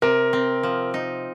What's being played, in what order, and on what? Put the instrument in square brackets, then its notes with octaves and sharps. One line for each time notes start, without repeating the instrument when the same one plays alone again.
[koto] C3 [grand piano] A#4
[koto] C4
F3
D#4